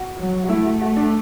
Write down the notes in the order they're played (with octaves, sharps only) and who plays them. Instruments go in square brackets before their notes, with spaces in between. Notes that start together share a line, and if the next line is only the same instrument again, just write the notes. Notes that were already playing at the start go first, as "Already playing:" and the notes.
Already playing: [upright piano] F#4
[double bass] F#3
[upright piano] F#4
[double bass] A3 [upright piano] E4
[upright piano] F#4
F#4
D4